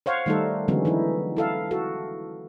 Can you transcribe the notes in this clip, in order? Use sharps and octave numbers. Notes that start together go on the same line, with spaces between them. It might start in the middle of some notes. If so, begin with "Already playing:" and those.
C5 C#5 F5 F#5
D#3 G3 A3 D#4 A4
D3 E3 F#3 G#3 B3 C#4
E3 D#4 E4
E4 A4 F5
F#4 A4